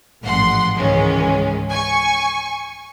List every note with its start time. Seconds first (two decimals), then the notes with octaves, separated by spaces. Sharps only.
0.23 A1 G#2 F3 F#5 C6
0.75 C#2 G#2 D#3 E3 G#3 C#4
1.70 G#5 C#6